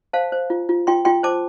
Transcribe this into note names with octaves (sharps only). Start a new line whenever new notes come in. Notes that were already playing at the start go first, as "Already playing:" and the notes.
C5 F5 A5
C5
F4
F4
F4 G5 C6
F4 G5 C6
C5 A5 D6